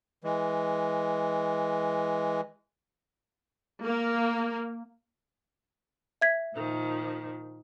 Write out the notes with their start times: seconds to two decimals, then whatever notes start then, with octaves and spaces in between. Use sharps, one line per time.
0.24 E3 G#3
3.84 A#3
6.21 E5 G#6 B6
6.54 A#2 D#3 F3